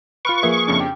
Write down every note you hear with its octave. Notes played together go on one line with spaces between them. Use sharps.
F4 B4 C#6 F6 D7
F3 A#3 G#4 B4 E5
F2 C#3 D4
G4